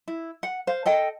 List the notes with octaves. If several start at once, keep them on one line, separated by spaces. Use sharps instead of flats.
E4
F#5
C5 F5
A4 D#5 G5